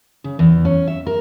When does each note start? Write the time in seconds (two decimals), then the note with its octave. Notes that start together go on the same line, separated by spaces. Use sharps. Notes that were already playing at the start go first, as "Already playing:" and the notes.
0.24 C#3
0.39 E2
0.65 C#4
0.87 E5
1.06 A#4